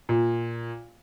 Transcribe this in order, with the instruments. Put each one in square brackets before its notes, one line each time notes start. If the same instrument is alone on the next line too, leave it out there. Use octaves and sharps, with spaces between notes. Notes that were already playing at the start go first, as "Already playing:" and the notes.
[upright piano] A#2